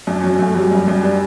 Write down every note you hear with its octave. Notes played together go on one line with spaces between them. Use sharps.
F#2 D4
C#4
F#3
C#4
F#2 A3
F#3 G3
F#2
F#2
D4